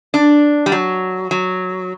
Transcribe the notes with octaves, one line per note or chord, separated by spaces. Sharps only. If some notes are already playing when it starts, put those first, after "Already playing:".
D4
G3
F#3
F#3